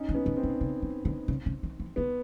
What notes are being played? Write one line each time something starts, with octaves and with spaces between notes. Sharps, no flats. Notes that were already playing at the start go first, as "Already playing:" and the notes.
Already playing: C#4 D#4
D#3
B3 C#4
D3
C4
C#3
C#3
D#3
D3
C#3
C#3
D#3
E3
D3 B3